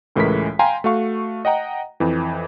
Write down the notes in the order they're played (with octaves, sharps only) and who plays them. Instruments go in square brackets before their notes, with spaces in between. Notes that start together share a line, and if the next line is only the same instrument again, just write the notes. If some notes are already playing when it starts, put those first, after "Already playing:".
[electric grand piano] C#2 A2 E3 G#3 A#4 B6
F5 G5 G#5 A#5 C6
A3 F#4 F5 C#6
D#5 F#5 G5 A#5
F2 E3